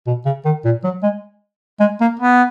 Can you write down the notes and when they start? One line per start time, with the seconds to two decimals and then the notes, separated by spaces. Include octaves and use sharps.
0.07 B2
0.25 C#3
0.45 D#3
0.65 A#2
0.84 F#3
1.03 G#3
1.80 G#3
2.01 A#3
2.20 B3